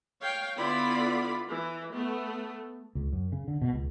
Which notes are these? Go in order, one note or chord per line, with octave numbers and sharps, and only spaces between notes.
C#5 F5 G5
D3 B3 E4 F4 D5 B5
E3
A3 B3
C#2
F#2
C#3
D3
B2
C#2